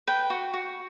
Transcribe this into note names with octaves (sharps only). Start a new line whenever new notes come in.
B4 G5
F#4
F#4